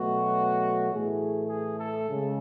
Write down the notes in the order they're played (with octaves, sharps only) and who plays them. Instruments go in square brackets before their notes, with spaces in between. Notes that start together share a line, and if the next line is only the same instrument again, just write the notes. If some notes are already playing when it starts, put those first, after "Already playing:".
Already playing: [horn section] B2 F#3 A3 F#4
A2 E3 A3 G#4
G#4
A4
C#3 G#3